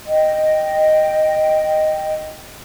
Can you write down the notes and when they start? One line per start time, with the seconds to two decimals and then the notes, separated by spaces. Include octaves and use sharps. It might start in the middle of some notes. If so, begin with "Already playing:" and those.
0.06 D#5 G5